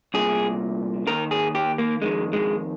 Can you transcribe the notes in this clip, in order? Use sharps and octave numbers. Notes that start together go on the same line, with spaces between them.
C2 A#2 G#4
D#2 D#3 A#4
G#4
G4
A#3
F2 D#3 G#3
G#3